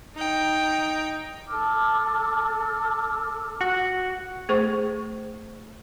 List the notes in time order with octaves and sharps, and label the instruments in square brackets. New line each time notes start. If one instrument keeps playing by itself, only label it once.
[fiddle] D#4 G5
[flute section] A4 D6 E6 F6
[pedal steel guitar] F#4
[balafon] A3 G#4 C5 C#6